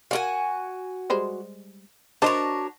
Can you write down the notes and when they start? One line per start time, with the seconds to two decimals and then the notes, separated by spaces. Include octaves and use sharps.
0.11 F#4 A#4 D5 F5 F#5 G#5
1.10 G3 G#3 C5
2.22 D4 F#4 A#4 C5 C#5 D#5 A5